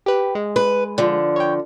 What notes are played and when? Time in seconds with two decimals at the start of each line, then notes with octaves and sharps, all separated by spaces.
0.06 G4 B4
0.35 G#3
0.56 B4
0.98 D3 F3
1.36 C#5 G5